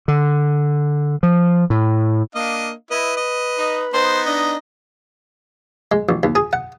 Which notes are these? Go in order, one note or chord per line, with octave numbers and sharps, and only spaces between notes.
D3
F3
A2
A#3 D4 D#5 F5
E4 B4 D#5
D#5
D#4
B3 D#4 C5
D4 D#5
G#3
A1
D#2
G#4
F#5